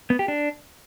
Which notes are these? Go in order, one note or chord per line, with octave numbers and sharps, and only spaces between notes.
B3
G4
D4